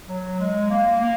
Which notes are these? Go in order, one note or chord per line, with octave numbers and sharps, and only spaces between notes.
F#3
G#3
A#3
A#3